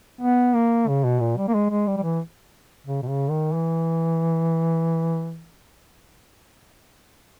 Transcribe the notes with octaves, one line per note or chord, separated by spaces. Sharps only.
B3
A#3
C#3
B2
A#2
G3
A#3
G#3
G#3
G3
G3
E3
C#3
B2
C#3
D#3
E3